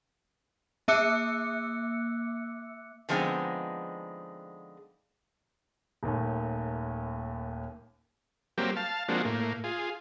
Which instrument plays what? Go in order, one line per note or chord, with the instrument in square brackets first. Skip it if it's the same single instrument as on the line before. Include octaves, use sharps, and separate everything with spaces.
[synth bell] A#3 E5 D6 E6 F#6 C#7
[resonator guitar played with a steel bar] D3 F3 G#3 B3 C4 D#4
[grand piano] D#1 D#2 A3
[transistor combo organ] F#3 G3 A#3 C4 G4
F5 A5
F3 G#3 A#3 C4 D4 F#4
A2 A#3
F4 G#4